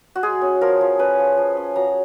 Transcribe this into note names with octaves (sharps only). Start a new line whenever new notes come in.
F#4
G#3 G#4
C#4
F3 A#4
F3
C#4 B4
F3
F3
C#4
F#3 A#5